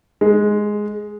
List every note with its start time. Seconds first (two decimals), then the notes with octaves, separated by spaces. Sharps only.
0.21 G#3